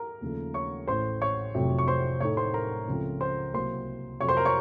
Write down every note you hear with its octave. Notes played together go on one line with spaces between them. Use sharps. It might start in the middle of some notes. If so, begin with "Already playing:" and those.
Already playing: A#4 A#5
D#2 C#3 F3 A3
C#5 C#6
A1 A2 A3 C5 C6
C#5 C#6
F1 F2 C3 F#3
C#6
C5 C6
A2 A3 D#4 C#5 C#6
C5 C6
A#4 A#5
C#2 C#3 F3 A3 C4
C5 C6
C2 C3 F#3 A#3 C5 C6
F2 C3 F#3 C#5 C#6
C5 C6
A#4 A#5
C#5 C#6